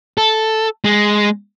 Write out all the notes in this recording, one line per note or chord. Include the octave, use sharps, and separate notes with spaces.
A4
G#3